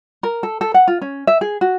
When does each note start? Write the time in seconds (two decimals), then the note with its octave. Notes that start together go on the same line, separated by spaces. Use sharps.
0.23 A#4
0.43 A4
0.61 A4
0.74 F#5
0.88 F4
1.02 C#4
1.27 E5
1.41 G#4
1.61 F#4